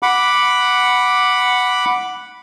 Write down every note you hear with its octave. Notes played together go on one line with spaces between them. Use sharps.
F#5 B5 D6